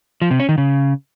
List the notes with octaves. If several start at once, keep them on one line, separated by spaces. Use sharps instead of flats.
F3
C3
C#4
D#3
C#3